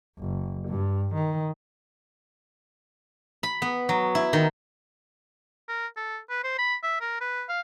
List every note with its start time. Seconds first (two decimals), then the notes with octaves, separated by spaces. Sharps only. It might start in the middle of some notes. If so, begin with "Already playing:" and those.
0.19 F#1
0.68 G2
1.14 D#3
3.43 B5
3.62 B3
3.89 F#3
4.15 E4
4.33 D#3
5.68 A#4
5.96 A4
6.30 B4
6.44 C5
6.58 B5
6.83 E5
7.01 A#4
7.21 B4
7.49 F5